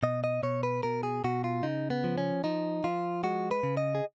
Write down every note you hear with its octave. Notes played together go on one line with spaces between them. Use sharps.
B2 D#5
D#5
B2 C#5
B4
B2 A#4
G#4
B2 F#4
F4
C#3 D#4
B3
F3
C#4
F3 D#4
F3 F4
G#3 F#4
B4
C#3
D#5
G#4